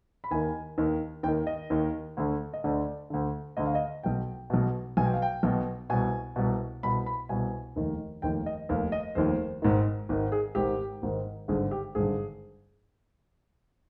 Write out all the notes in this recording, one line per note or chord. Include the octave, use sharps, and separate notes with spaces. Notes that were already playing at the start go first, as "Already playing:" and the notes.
B5
D#2 D#3 G#5
D#2 D#3
D#2 D#3 G5
D#5
D#2 D#3
D2 D3
D#5
D2 D3 D5
D2 D3
D2 D3 D#5
F5
D#5
B1 B2 G5
B1 B2
B1 B2 G#5
G5
F5
G5
B1 B2
C2 B2 G#5
C2 B2
C2 B2 B5
B5
C2 B2 G#5
F1 D#2 D#3
F1 D#2 D#3 G5
D#5
F1 D#2 D#3 F5
D#5
F1 D#2 D#3 C5
G#1 G#2 D#3
G#1 G#2 D#3
G#4
G#1 G#2 D#3 G4
G#1 G#2 D#3
G#1 G2 D3 G#4
G4
G#1 G2 D3 G#4